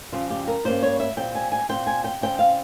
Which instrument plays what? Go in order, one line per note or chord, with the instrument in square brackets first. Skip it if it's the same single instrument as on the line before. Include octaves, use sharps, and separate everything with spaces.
[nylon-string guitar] F2 C#3 G3 C4 F4
G4
A#4
G2 G3 A#3 C#4 C5
C#5
E5
A#2 G3 C4 G5
G#5
G#5
A#2 F3 C4 G5
G#5
G5
C#3 G3 C4 G5
F5